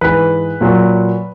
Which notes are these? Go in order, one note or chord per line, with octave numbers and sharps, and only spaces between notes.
G#2 E3 B4
A#2 F#3